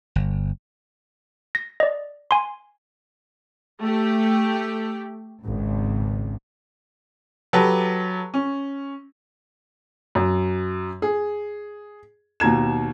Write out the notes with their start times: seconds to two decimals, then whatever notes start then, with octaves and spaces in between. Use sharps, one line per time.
0.16 G1
1.55 A#6
1.80 D5 D#5
2.31 G#5 C6
3.82 A3 G4
5.43 G#1 C#2
7.53 F#3 G4 A4 B4 A5
8.34 C#4
10.15 F#2
11.02 G#4
12.40 D#2 B2 A#5 G#6 E7